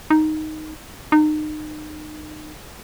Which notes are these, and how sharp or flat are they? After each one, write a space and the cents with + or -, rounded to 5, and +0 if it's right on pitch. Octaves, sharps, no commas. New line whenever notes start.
D#4 +0
D#4 -30